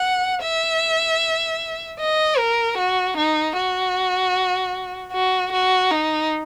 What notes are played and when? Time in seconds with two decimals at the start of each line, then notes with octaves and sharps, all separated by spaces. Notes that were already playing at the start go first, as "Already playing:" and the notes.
Already playing: F#5
0.43 E5
2.00 D#5
2.38 A#4
2.78 F#4
3.17 D#4
3.57 F#4
5.12 F#4
5.52 F#4
5.91 D#4